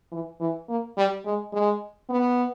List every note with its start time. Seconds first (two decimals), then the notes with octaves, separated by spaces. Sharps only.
0.12 E3
0.40 E3
0.69 A#3
0.97 G3
1.25 G#3
1.53 G#3
2.09 B3